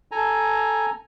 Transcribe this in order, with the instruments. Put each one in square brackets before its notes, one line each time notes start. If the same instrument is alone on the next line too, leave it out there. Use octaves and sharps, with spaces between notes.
[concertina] A4 G#5 A#5